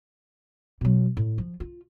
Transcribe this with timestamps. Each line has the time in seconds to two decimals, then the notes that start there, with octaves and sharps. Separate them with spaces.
0.81 B2 F#3
1.17 A2
1.38 F3
1.60 F4